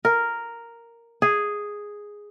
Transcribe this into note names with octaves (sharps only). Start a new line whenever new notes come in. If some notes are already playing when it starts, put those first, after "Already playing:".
A#4
G#4